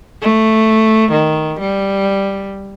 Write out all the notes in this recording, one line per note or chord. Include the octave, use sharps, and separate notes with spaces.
A3
D#3
G3